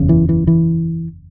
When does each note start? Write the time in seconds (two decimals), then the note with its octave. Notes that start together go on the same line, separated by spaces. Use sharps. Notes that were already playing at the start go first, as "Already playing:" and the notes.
Already playing: F#1 E2 C#3
0.09 E3
0.29 E3
0.47 E3